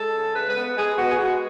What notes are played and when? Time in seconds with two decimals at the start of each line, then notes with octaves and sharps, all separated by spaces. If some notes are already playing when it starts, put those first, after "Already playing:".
Already playing: G#3 A4
0.14 C#3
0.35 C#3 B4
0.49 B4
0.56 B3
0.76 G#3 G#4
0.97 B3 F#4
1.11 G#4
1.18 G#3 F#4